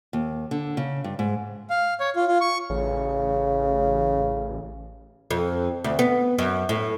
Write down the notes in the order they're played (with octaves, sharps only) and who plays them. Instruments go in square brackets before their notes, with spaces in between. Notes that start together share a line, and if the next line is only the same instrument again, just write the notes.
[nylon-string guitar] D#2
D3
C#3
G2
G#2
[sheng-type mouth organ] F5
C#5
F4
F4
C#6
[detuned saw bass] A1 [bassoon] C#3
[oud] F2
D2
B3
F#2
A2